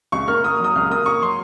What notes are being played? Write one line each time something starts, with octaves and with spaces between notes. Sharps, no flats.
C#2 C#6
A#3 F6
A#3 D#6
F#3 D#6
C#2 F6
A#3 D#6
A#3 C#6
F#3 C6